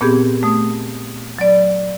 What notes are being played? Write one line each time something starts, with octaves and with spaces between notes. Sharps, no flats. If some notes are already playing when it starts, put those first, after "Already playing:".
A#2 B3 C4 G4 G#4
A3 D#6
F#3 D5